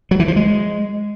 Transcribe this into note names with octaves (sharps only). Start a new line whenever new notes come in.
F#3
E3
F3
G#3